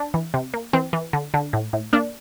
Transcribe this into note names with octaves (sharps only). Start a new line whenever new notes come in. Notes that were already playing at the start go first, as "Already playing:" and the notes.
Already playing: D4
E3
C3
A#3
E3 C4
E3
D3
D3
A2
A2
A#3 D4